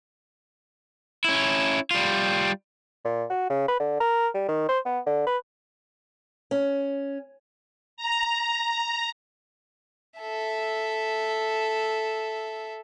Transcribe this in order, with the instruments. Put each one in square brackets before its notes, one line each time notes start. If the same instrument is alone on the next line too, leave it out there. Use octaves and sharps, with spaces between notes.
[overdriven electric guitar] C#4 E4
G3 F4
[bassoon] A#2
F#4
C#3
B4
D3
A#4
G3
D#3
C5
B3
D3
B4
[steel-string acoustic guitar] C#4
[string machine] A#5
[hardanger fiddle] A4 E5